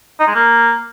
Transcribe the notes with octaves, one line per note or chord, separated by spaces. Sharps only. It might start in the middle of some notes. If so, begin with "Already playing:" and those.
D#4
G#3
A#3